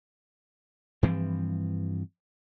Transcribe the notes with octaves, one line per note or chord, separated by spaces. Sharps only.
G2 E3 F3 C4